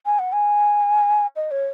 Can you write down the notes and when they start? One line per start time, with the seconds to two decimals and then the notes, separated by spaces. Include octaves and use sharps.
0.06 G#5
0.19 F#5
0.33 G#5
1.36 D#5
1.51 C#5